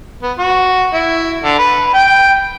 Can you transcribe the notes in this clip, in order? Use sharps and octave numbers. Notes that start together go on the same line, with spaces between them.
B3
F#4
E4
D3
B4
G5